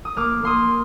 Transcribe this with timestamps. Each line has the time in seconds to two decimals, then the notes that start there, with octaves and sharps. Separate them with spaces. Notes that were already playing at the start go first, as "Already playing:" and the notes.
0.05 D#6
0.16 A#3 D6 F6
0.43 A#3 C6 D#6